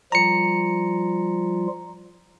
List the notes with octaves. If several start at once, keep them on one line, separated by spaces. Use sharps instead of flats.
F3 G3 F4 A#5 C#7